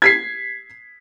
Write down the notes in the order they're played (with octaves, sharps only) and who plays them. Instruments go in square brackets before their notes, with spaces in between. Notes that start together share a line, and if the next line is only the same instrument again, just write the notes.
[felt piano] G#6 B6 C7